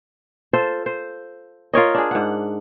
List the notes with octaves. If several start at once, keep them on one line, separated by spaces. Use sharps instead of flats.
F4 A4 C5
C5
F4 A#4 C#5 D#5
D4 G#4
G#2 F#5